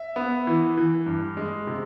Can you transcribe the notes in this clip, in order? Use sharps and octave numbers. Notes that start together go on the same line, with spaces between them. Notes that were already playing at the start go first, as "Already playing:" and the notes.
Already playing: E5
B3
E3
E3
G2
G#3
C3